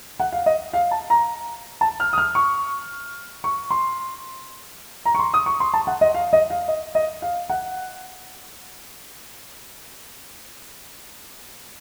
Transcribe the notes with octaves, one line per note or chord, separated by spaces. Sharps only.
F#5
F5
D#5
F5
A5
A#5
A5
F6
D#6
F6
C#6
C#6
C6
A#5
C#6
C6
D#6
C#6
C6
A5
F#5
D#5
F5
D#5
F5
D#5
D#5
F5
F#5